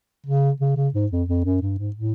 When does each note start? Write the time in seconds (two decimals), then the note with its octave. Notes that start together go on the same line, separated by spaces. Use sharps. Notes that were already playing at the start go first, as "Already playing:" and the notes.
0.26 C#3
0.60 C#3
0.76 C#3
0.94 G#2
1.11 F2
1.28 F2
1.45 F#2
1.62 G2
1.78 G#2
1.96 A2